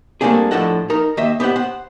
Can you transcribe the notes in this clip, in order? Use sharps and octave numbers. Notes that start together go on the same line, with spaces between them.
G3 A3 A#3 C4 D4 G#4
A2 F3 D4 A4 D#5 F#5
D#4 A#4 A#5
D#2 D#5 E5
B3 G4 C5 D#5 F#5
C5 F#5